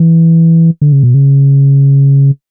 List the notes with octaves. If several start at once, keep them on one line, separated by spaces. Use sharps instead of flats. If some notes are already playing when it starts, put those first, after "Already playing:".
Already playing: E3
D3
C#3
B2
C#3